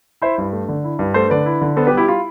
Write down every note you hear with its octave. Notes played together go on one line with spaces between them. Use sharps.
E4 C5 E5
G2
A3
D3
E4
G2
A3 A4 C5
D3 B4 D5
E4
D3
B3 A4 C5
G4 B4
G3
E4 G4
E4 F4